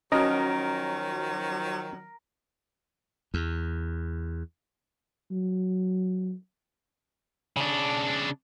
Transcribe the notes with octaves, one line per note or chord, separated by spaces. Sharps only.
D#3 F3 F#3 C#4 F#4 A#4 D#5
E2
F#3
C#3 D4